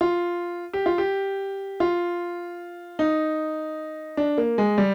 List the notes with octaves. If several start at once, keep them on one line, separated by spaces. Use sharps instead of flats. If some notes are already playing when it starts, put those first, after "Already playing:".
F4
G4
F4
G4
F4
D#4
D4
A#3
G#3
G3